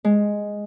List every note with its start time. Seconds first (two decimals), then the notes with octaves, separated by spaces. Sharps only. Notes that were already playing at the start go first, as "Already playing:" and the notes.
0.04 G#3